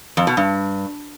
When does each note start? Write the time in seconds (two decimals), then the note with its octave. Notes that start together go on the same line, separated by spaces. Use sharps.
0.17 F2
0.27 B2
0.37 G2